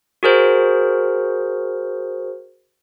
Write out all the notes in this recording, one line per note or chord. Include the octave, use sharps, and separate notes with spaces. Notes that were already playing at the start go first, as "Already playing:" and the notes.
F#4 G#4 A#4 C5